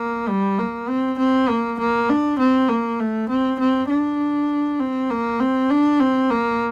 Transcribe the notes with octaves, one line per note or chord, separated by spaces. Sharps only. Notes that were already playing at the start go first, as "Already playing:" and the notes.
Already playing: A#3
G3
A#3
C4
C4
A#3
A#3
D4
C4
A#3
A3
C4
C4
D4
C4
A#3
C4
D4
C4
A#3